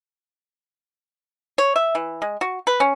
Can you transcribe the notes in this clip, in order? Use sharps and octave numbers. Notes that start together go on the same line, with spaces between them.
C#5
E5
E3
G#3
F#4
B4
C#4